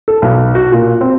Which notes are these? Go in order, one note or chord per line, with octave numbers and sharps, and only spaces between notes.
A4
B1
F#4
A#2
C4